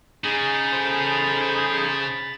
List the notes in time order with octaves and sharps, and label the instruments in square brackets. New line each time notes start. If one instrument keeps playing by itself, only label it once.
[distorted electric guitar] C#3 [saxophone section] D#4 G#4 [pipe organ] B5 A6
[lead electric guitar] A4 C5